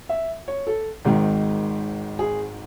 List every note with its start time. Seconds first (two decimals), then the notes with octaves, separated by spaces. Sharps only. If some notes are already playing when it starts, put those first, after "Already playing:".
0.09 E5
0.48 C#5
0.67 A4
1.05 G#1 G#2 D#3
2.19 G#4